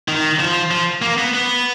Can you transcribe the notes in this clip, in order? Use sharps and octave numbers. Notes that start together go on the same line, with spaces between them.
D#3
F3
F3
A#3
B3
B3